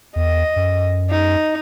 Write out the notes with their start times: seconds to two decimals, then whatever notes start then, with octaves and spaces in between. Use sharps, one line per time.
0.16 E2 D#5
0.56 F#2
1.10 D#4